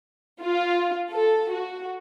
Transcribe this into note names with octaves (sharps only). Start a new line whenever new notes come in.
F4
A4
F#4